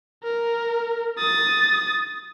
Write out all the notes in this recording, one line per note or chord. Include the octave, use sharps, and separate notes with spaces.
A#4
D#6 A6